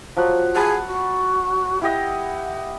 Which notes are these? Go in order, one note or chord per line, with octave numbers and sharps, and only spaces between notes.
F3 F#3 F#5
G#4 F#5 A5 B5
F#4
E4 G4 D#5 F#5